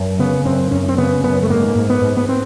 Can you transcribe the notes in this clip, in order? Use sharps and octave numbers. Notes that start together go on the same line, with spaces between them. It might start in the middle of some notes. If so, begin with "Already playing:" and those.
Already playing: F#2
C#3 B3
F#2 C4
F#2 C#4
C4
C#3 B3
F#2 B3
A3
G#2 A#3
G#2
B3
G#2
B3
C4